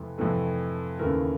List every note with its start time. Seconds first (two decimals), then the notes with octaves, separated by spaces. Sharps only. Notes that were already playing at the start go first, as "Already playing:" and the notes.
Already playing: F2 C3 E3 A3
0.18 F2 C3 E3 A3
0.99 D#2 C#3 E3 A3 A#4